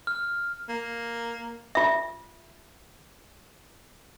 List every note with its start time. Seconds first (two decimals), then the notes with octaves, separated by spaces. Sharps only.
0.07 F6
0.69 A#3
1.75 F4 E5